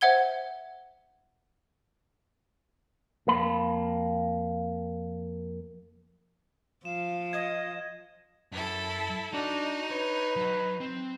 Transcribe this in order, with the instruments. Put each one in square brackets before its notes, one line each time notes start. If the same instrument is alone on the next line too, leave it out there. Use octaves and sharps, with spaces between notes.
[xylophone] C5 E5 F#5 G#6 G7
[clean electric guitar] F2 A#3 B5
[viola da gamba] F3 [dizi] F5 [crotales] E7
[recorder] D#5 [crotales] G#6
[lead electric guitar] F#2 [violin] E4 A4
[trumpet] D4 [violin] D#4 [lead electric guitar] F#4
[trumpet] B4 [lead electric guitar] C#5
[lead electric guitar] F#3
C4